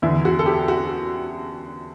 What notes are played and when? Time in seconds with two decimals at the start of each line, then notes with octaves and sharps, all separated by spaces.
0.02 E2 D3 E4
0.25 F#4
0.39 A4
0.46 G4
0.68 F#4